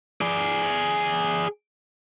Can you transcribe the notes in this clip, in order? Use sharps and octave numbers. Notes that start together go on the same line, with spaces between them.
G#4 D5